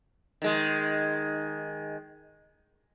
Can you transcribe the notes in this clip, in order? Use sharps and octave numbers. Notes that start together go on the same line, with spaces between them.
D#3 G#3